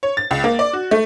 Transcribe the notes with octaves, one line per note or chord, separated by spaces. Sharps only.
C#5
A6
C#2
A#3
D5
F#4
A3